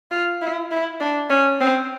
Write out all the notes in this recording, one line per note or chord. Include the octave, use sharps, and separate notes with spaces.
F4
E4
E4
D4
C#4
C4